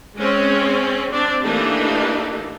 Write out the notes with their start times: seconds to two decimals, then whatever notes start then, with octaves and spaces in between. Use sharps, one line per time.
0.17 G#3 C4 C#4
1.12 C4 D4
1.43 E3 A3 A#3 D4 D#4 G4